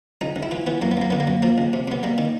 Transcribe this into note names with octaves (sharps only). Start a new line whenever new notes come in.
C#2 D#4
C#2
E4
E3 F4
E3 B3
F#2 A#3
B3
F#2 A#3
D3 B3
A#3
F#2
F3 A#3
C#2
C3
C3 B3
G3 A#3
D#3